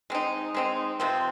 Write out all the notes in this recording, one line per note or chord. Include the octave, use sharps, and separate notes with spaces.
G#3 C4 D#4
G#3 C4 D#4
C3 F3 C4